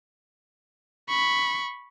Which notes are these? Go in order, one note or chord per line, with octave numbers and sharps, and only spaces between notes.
B5 C#6